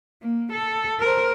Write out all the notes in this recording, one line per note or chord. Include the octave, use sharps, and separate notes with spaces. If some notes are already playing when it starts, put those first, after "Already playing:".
A#3
A4
A#4 C5